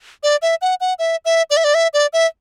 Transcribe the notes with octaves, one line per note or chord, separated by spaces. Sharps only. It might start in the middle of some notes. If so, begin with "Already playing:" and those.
D5
E5
F#5
F#5
E5
E5
D5
E5
D5
E5
D5
E5